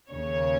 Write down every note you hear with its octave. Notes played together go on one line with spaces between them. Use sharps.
D#2 C#3 C#5